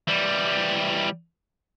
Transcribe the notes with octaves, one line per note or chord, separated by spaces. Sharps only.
E3 G3